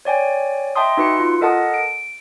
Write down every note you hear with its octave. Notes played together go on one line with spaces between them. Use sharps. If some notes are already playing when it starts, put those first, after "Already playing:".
C#5 D5 G5 G#5
D#5 E5 G5 A5 C6 D#6
D#4 F#4 B4 C6 C#7
F4
A4 A#4 D#5 F#5 A5 D#6
D7